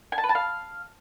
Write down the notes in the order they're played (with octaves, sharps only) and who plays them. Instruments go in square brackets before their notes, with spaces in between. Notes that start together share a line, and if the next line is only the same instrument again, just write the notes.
[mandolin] G#5
A5
B4
A5
F5